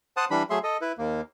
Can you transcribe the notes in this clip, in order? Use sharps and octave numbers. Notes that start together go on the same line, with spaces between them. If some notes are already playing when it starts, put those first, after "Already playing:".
C5 F#5 A5 D#6
E3 G3 D4 B5
F#3 A3 G#4 E5 C6
A4 D#5
E4 B4
D#2 A#3